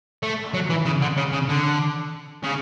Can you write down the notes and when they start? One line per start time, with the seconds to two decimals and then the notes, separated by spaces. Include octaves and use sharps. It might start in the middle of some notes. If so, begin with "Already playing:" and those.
0.23 A3
0.54 F#3
0.70 E3
0.85 C#3
1.01 D3
1.17 C#3
1.33 C#3
1.49 D3
2.43 C#3